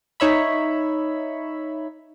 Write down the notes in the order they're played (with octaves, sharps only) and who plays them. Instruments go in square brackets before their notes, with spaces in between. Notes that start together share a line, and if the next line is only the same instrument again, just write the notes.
[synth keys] D#4 C#5 E5 B5